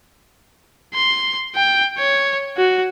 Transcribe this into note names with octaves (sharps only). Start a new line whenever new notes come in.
C6
G5
C#5
F#4